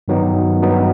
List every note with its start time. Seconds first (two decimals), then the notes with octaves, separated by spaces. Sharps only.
0.08 G2 D#3 F#3 B3 D#4
0.61 G2 D#3 F#3 B3 D#4